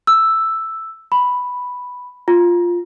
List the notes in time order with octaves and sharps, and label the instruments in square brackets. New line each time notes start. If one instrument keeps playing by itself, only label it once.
[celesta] E6
B5
F4